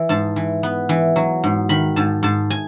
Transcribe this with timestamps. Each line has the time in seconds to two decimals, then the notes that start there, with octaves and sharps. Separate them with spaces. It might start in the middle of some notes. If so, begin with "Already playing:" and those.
Already playing: E3
0.09 G#2 A5
0.36 E3
0.63 B3
0.89 E3
1.16 F#3
1.44 G#2
1.69 D#3 B5
1.96 G#2 A5
2.23 G#2 A5
2.50 G#5